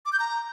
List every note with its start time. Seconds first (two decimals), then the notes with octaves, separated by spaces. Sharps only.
0.06 D6
0.13 G6
0.20 A#5